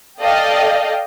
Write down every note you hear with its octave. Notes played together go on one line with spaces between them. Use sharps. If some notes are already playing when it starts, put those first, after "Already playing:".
A4 D5 D#5 F5 G5